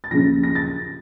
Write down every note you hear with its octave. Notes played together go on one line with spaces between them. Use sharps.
A6
D#2 C#3 F3 A#6
A#6
A6